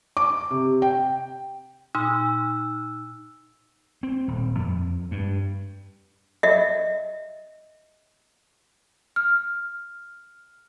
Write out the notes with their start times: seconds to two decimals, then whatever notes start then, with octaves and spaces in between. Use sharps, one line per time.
0.17 D6
0.51 C3
0.82 G5
1.95 A#2 D#4 C6 D#6 E6
4.03 C4
4.28 D#1
4.58 F2
5.11 G2
6.43 D#5 E5
9.16 F6